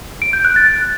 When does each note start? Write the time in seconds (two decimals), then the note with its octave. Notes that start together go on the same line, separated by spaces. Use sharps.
0.22 D7
0.33 G6
0.45 F#6
0.56 A6